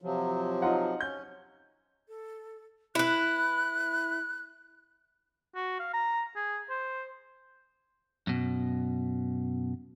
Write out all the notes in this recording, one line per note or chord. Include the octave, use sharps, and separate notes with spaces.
C3 F3 F#3
D#4 F4 F#5
C#4 G6
A4
E4 B4 F#6
F#4
F5
A#5
G#4
C5
F#2 B2